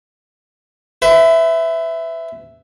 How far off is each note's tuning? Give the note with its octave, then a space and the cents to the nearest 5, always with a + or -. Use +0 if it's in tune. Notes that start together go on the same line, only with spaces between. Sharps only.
B4 +35 E5 +0